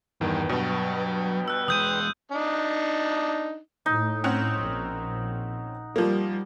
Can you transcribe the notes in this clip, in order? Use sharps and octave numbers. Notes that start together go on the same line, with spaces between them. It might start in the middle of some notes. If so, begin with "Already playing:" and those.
E2 G2 D#3 B4 G5
G2 B2 F#3 C#5
E6 F#6
E2 G#3 D#6 G6 D#7
D4 D#4
A2 D#4
C4 C#4 F#5
A#1
F3 G3 A#3